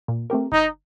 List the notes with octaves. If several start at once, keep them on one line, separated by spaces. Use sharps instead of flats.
A#2
A3 C4 G4 A#4
G1 D#4